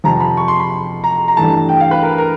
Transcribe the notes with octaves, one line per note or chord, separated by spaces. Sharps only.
F2 C3 F3 A#5
B5
C#6
C6
B5
A#5
A#5
G2 E3 A3 A5
G5
F5
B4
A#4
A#4